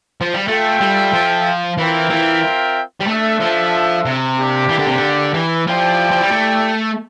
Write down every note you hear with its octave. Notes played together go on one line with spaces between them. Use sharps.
F3
G3
A3 F4 A4 E5 G5
G3
F3
E3 C4 F4 A#4 E5 G5
E3
G3
A3 D4 A4 E5
F3
C3
A#3 D4 G4 D5
E3
D3
C3
D3
E3
F3 E4 G4 D5 G5
F3
G3
A3